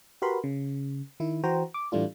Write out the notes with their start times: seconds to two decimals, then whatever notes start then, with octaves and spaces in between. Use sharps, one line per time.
0.22 F#4 G4 A#4 B4 B5 C6
0.44 C#3
1.20 D#3 E4
1.43 E3 F#4 C5 G5 A#5
1.74 D6
1.92 A2 E3 G3 A3 D4 F4